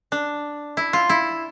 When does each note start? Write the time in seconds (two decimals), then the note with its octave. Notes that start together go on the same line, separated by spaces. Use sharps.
0.12 D4
0.77 E4
0.93 F4
1.09 E4